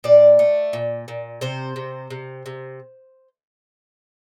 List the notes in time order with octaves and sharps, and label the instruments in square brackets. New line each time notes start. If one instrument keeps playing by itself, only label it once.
[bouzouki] A#2 D5
A3
A#2
A#2
C3 C5
C3
C3
C3